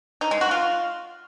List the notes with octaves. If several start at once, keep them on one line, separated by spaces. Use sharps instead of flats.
D#4
G#3
F#4
F4